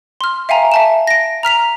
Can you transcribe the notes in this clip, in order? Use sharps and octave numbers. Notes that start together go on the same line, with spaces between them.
C6 F6
E5 F5 G5 G#5 A#5
E5 A5 E7
A#6 D7
A#5 F6 B6 F7